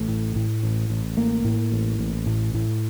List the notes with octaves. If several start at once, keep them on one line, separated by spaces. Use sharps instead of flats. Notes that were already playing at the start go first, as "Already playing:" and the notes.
Already playing: A1 A3
A2
A2
A1
A1
A2 A#3
A2
A1
A1
A2
A2